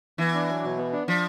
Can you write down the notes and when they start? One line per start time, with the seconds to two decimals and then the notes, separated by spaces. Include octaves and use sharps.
0.18 E3 B3
0.34 D4
0.48 F#3
0.63 B2
0.78 B3
0.93 D4
1.08 F3 D4